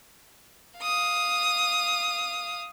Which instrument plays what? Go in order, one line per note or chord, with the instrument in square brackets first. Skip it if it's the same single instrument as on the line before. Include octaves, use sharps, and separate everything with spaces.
[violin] F5 D#6